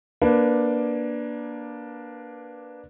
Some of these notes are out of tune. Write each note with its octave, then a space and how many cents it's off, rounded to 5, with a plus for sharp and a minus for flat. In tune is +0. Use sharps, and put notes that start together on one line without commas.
A#3 +20 D4 +0 B4 +5